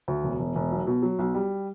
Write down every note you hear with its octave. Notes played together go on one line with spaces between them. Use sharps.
D2
E1
E1
E1
B1
B2
F#3
B1
G3